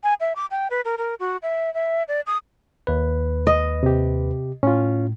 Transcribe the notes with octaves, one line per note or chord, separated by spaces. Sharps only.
G#5
E5
D6
G5
B4
A#4
A#4
F#4
E5
E5
D5
D#6
D#2 B4
D#5
C3 G4
A2 C#4 F4